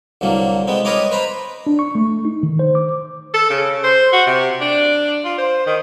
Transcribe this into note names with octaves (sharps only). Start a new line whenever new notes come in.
C2 D3 F#3 A#3
G#3 B3 C4
A#4 B4 C#5 D#5 A#5 D6
B4 C5 A#5 B5
D4
C#6
A3
D#4
D#3
C5
D6
A4
C#3
C5
F#4
C3
D4
F4
C5
D#3